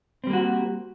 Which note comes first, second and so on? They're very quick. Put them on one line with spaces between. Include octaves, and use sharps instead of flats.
C4 G3 A#3 F#4